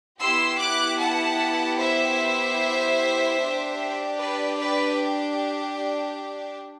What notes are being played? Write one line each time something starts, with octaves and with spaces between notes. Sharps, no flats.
B3 E4 G4 C6 E6
D6 F#6
F#5 A5
C5 E5
D4 G4
B4 D5
B4 D5